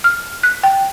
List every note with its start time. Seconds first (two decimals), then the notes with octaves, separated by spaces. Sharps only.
0.04 F6
0.43 F#6
0.63 G5